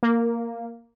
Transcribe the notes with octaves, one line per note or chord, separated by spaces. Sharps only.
A#3